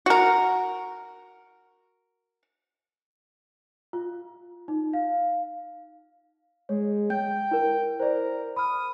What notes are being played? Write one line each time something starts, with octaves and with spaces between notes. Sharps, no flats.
F#4 A#4
F4
D#4
F5
G#3 C#5
G5 G6
E4 A#4
A#4 C5 D5
B5 D#6 F6